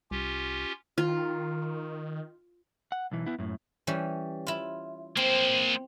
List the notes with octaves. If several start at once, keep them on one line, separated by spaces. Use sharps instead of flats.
C2 C#4 F4 G4
D#3 F4
F#5
B1 E3
B3 E4
F#2 A2
E3 G3 C#4
E4 F4
A#3 C4 C5